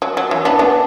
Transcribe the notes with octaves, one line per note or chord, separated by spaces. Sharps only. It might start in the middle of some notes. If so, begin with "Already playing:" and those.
F#3
F#3
E3
B3 D4
B3 D4